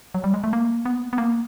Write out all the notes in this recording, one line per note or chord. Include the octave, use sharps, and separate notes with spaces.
F#3
G3
G#3
A3
A#3
B3
B3
A#3